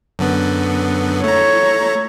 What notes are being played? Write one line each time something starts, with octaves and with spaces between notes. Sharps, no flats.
F#2 D3 B3
A3 C#5 A#5